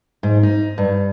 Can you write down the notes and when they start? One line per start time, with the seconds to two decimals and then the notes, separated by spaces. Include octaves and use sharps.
0.23 G#2
0.43 D#4
0.78 G2